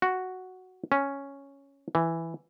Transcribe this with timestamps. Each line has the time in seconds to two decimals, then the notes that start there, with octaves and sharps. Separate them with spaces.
0.02 F#4
0.92 C#4
1.95 E3